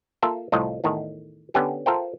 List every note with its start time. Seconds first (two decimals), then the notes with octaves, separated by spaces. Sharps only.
0.22 A#3 F4 A4 E5
0.52 C2 F2 A2 F4 D#5
0.84 E2 A2 D#3
1.54 D3 B3 C#4 G4 A4
1.86 F4 A4 A#4 C5 E5 G5